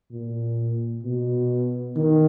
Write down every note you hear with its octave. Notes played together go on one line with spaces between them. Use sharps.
A#2
B2
D#3